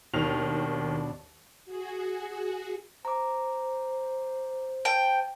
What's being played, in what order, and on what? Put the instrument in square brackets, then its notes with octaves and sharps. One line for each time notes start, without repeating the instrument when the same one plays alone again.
[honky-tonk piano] D#2 D#3 F7 [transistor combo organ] B2 D4
[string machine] F#4 G#4
[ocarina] C5 [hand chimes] A#5 D6
[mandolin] G5 [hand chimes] A5